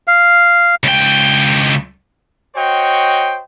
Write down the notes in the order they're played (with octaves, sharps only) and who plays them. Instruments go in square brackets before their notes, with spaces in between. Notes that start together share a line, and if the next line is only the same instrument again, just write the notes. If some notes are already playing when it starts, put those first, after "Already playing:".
[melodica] F5
[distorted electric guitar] C#2 G5
[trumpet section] F#4 C5 C#5 D#5 G5